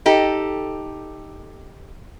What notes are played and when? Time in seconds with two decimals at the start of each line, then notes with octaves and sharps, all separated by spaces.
0.06 D#4 G4 A4